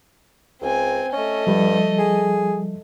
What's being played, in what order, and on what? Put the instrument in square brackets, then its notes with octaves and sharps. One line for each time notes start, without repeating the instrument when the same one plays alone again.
[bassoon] C#2 [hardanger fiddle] C4 G#5
[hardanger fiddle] A3 D#5 [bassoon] C#4
[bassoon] G2 [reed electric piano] F3 G3
[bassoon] G#4